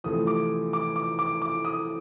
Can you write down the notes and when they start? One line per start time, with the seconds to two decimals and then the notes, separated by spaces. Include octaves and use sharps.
0.04 E2 C3 F3 A3 D#6
0.27 D6
0.73 D6
0.96 D6
1.19 D6
1.42 D6
1.65 D#6